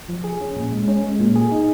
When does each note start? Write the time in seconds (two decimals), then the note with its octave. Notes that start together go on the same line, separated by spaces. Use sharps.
0.09 F3
0.24 G#4
0.41 C#4
0.56 A#2
0.72 G#3
0.88 C#4
1.04 G#3
1.20 A#2
1.36 G#4
1.51 D#4